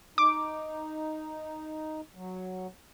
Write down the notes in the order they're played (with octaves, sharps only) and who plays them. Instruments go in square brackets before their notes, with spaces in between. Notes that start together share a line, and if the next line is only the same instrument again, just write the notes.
[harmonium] D#4 [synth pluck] D6
[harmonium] F#3